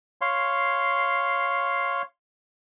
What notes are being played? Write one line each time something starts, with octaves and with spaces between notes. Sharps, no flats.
C#5 F5 C6